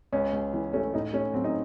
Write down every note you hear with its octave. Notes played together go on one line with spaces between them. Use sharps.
C#2 C#4
C#2
E3
A3 C#4
A2 D#4
A3 C#4
F#3 C4
D#4